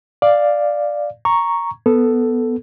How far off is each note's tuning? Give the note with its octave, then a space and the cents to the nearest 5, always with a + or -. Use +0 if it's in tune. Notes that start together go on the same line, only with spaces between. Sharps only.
D5 +5 F5 +0
A#5 +0 C#6 +0
B3 +0 A4 +0